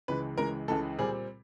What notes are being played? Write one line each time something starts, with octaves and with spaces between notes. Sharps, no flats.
C#2 C#3 E3 G#3 B4
C#2 C#3 E3 G#3 A#4
C#2 C#3 E3 G#3 A4
A#2 G3 C4 G#4